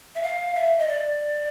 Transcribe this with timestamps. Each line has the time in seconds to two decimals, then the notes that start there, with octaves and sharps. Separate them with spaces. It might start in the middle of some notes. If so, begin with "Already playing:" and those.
0.15 E5
0.23 F5
0.55 E5
0.79 D#5
0.87 D5